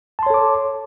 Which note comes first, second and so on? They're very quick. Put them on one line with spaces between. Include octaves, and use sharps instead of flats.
A5 C6 C#5 A4 D6